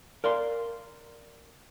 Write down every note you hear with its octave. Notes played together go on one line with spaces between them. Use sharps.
A#4 D5 F5 C6